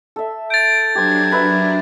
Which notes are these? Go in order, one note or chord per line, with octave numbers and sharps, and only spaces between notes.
A4 E5
G6 A6 D7
F#3 D4 G4 C5 A#5 G#6
A#4 B4 E5